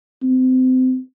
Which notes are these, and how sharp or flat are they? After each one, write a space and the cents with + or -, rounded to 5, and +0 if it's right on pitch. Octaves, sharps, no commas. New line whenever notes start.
C4 -30